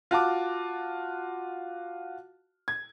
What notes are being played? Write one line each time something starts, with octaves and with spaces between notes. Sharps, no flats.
F4 F#4 A5 D6
G#6